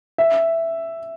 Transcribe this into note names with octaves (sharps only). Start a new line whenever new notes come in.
E5